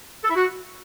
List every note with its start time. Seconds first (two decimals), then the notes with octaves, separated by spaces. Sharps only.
0.24 A4
0.30 E4
0.36 F#4